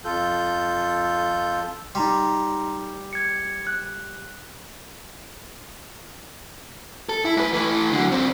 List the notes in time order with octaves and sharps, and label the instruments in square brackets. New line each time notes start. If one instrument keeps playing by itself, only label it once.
[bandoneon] F2 F4 A4 G6
[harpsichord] G3 [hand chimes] D#4 A#5 C6
[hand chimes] G#6 C#7
F#6
[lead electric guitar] A4
E4
G#2 B4
E3 A3
D3 F#3
G2 C4